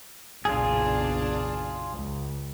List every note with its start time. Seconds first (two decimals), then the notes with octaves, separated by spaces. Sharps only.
0.45 F#1 B1 A#2 D4 F4 G#4
1.93 C#2